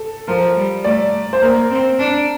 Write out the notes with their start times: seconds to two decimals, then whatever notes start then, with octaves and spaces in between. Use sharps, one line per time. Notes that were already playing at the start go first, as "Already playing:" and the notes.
Already playing: A4
0.28 F3 A#4
0.56 G3
0.84 A3 D5
1.33 C5
1.42 A#3 A#4
1.70 C4
1.99 D4